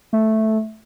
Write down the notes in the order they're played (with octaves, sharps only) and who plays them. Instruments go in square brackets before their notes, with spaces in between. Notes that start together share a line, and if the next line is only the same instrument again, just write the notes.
[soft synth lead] A3